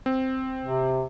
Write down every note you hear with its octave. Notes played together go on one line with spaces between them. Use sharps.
C4
C3